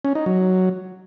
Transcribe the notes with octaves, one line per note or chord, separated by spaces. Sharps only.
C#4
D#4
F#3